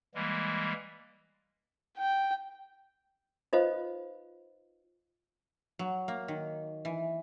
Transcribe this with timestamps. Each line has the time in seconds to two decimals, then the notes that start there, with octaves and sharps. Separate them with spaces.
0.15 E3 G3 G#3 A#3
1.98 G5
3.53 D#4 F4 B4 C5 D#5 F5
5.79 F#3
6.08 A#3
6.28 D#3
6.85 E3